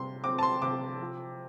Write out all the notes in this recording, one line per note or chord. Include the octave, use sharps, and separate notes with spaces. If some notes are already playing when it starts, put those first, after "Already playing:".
Already playing: C3 G3 C6
C4 D6
A5
C6
C3 D6
F3